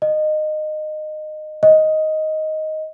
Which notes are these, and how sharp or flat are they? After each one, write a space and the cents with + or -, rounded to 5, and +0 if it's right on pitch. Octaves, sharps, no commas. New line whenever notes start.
D#5 -20
D#5 +5